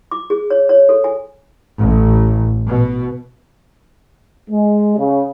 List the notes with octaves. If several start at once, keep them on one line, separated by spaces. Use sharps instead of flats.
D6
G#4
C#5
C#5
A4
G#5
A1
B2
G#3
C#3